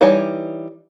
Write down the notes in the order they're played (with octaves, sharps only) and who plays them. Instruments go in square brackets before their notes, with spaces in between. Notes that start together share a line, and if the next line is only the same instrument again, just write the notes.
[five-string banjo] E3 G3 D#4 C#5 G#5